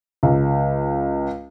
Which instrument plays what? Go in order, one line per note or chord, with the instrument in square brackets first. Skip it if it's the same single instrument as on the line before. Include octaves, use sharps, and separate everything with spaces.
[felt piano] C#2